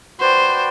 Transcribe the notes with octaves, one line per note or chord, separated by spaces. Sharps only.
F#4 B4 C5 D5 G5